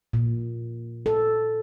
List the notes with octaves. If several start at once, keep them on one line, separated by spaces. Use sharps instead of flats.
A#2
A4